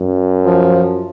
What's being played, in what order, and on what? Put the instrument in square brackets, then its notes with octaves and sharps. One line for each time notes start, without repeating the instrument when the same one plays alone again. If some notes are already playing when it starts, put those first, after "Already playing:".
Already playing: [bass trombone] F#2
[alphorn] F3